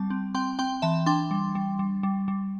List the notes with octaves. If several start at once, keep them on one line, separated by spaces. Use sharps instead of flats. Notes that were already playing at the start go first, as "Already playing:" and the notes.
Already playing: G3 C4 A5
C4
C4 G5 C6
C4 G5 C6
E3 E5 A5
D4 G5 C6
G3
G3
G3
G3
G3